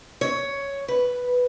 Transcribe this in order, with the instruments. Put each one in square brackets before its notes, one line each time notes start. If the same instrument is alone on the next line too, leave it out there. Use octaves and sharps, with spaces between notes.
[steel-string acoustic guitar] C#5
B4